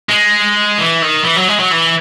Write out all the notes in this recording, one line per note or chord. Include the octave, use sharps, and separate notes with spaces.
G#3
E3
D#3
E3
F#3
G#3
F#3
E3